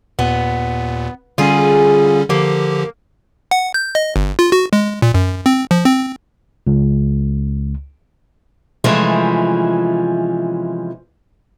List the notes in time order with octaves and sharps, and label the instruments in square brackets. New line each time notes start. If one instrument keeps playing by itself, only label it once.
[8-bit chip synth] D#2 A#2 [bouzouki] B3
[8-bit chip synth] D3 G3 C#4 [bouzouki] F4 G#4
[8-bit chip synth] D3 F3 G4 [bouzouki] A#3
[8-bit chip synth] F#5
G6
D#5
G1
F4
F#4
G#3
A#2
F#2
C4
F3
C4
[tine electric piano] C#2
[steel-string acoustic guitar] C3 E3 F3 G#3 A3 C#4